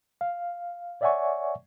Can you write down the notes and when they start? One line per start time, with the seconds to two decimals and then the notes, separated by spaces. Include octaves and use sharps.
0.21 F5
1.01 C#5 D5 E5 F#5 G#5 C#6